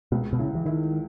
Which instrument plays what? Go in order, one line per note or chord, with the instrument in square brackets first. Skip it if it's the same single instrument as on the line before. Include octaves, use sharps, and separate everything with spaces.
[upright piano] C#2 [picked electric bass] B2
[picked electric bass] B2
[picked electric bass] C#3 [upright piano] E4
[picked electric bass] E3
[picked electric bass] D#3 [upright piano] E4